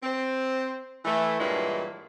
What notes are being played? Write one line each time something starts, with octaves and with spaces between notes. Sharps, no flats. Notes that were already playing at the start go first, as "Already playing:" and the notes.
C4
E3 A3
G2 A#2 E3 F#3 G#3